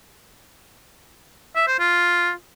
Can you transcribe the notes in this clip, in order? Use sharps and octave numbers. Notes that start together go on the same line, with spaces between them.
E5
C5
F4